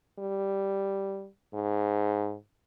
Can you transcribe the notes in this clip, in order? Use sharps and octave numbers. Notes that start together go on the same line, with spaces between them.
G3
G#2